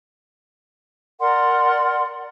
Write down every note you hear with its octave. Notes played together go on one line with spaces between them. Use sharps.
A#4 D5 F#5 C6